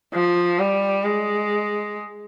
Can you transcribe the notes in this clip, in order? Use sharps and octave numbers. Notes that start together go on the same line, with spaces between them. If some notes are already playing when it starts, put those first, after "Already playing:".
F3
G3
G#3